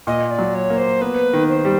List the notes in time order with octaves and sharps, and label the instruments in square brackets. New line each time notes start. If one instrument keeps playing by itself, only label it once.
[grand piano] A#2 [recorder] D#5
[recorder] D5
[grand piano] F#3
[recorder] C#5
[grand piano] A#3
[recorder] C5
[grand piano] B3 [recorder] B4
[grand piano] D#3
[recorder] C5
[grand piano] G3